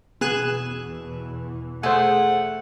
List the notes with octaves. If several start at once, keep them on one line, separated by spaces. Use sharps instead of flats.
E2 B2 E3 B3 G#4 F#6 E7
A3 G#4 C5 F#5